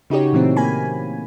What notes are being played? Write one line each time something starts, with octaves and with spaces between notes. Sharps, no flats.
C#3 D#4 F#4 G4 C#5
A#2 E3 A3 C4
A#3 G#5 B5